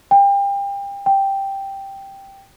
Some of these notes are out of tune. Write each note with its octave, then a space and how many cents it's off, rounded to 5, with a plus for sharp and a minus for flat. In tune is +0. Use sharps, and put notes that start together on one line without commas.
G5 +30
G5 +0